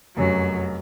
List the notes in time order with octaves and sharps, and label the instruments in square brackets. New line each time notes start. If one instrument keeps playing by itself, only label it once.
[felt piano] F1 F#2 [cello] F#3